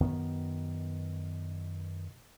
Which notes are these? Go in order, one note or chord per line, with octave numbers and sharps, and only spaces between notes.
F#2 B2 D#3 B3